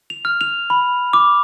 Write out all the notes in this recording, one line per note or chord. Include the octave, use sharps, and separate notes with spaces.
F7
F6
F7
B5
D6